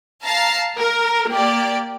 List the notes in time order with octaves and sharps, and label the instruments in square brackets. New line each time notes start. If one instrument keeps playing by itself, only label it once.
[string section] F5 A5 A#5 A6 C7
A#4
A#3 G4 D5